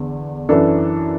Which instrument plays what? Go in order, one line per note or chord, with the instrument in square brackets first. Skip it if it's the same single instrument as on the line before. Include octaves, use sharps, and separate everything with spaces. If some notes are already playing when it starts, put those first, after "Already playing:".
Already playing: [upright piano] E2 D3
F#2 E3 D4 A4